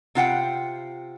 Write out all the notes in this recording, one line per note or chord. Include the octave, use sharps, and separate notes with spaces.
C3 F4 F#5 G5